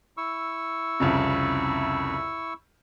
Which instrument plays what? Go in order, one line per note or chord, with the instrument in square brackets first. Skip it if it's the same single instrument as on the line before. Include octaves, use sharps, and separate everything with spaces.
[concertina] E4 C#6 E6
[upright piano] C2 F2 C#3